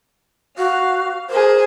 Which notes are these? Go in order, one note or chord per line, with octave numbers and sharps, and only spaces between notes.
F#4 F5
G#4 A#4 C5